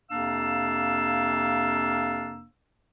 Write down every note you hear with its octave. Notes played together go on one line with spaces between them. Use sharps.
F2 C3 A#3 D4 F5 E6